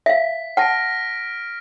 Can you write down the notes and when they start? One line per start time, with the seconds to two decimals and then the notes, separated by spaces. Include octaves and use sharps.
0.06 E5 F5 B6
0.57 F#5 A5 F6 A#6 D7